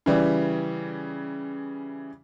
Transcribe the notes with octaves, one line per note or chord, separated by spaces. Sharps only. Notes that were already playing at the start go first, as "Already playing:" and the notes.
C#3 E3 G3